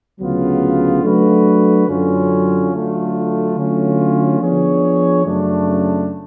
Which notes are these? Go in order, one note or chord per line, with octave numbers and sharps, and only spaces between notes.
D2 C#3 F#3 B3 F4
F#3 A3 D4 F#4 B4
F#2 D3 F#3 C#4 F4
D3 F#3 A3 F4
D3 F#3 A3 C#4 F4
F3 B3 D4 G#4 C#5
F#2 C#3 F#3 A3 D4